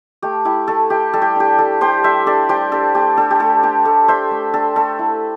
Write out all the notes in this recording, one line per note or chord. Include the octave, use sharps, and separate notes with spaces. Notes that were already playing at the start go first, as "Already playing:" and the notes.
A3 G4
E4 G4
A3 A4
E4 G4
G3 A4
G4
D4 G4
G3 A4
D4 G4 C5
G3 C5 E5
D4 A4 D5
G3 G4 C5
D4 A4
A3 G4
D4 A4
G4
A3 A4
D4 G4
A3 A4
D4 C5 E5
A3
D4 A4
A3 A4
E4